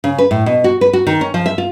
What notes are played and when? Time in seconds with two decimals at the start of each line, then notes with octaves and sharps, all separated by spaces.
0.04 C#3
0.18 B4
0.31 A2
0.46 B2
0.64 F#4
0.81 B4
0.93 F#4
1.07 D#3
1.21 C#4
1.34 F3
1.46 E5
1.58 F4